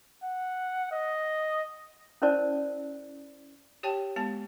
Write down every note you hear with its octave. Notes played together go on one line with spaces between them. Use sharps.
F#5
D#5
C#4 E4 A#4 C5 D5 A5
G4 C#5 G5 A5
G#3 B3 A5